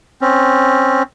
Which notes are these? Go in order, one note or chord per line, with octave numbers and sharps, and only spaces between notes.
C4 C#4